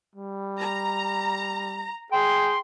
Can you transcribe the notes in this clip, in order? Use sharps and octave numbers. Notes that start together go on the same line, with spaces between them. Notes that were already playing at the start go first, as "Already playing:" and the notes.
G3
A#5
G#4 G5 C6